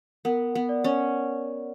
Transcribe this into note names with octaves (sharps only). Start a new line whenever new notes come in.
B3 A#4
B3
D5
C#4